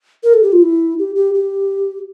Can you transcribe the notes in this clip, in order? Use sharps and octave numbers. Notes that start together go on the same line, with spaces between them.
A#4
A4
G4
F4
E4
G4
G4
G4